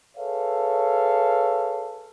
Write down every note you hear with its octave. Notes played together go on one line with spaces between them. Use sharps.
G#4 A4 B4 C#5 E5 F5